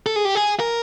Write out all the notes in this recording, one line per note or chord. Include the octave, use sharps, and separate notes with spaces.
A4
G#4
G4
G#4
A#4